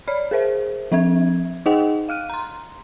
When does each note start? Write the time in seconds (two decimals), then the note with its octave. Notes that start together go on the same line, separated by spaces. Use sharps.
0.07 C#5 D5 B5 F6
0.31 G#4 A#4 C5 E5
0.92 F3 C4 E5 G#6
1.66 D#4 G#4 D#5 F#5 G5
2.09 F5 F6 F#6 D#7
2.30 A#5 C6